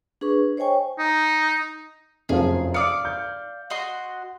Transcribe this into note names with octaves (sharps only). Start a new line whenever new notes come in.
D4 G#4 B4 C#6
C5 C#5 D#5 G5 G#5 C#6
D#4
F1 F#2 F3 G#4
D5 F5 D#6 C#7
G6
F#4 D#5 C6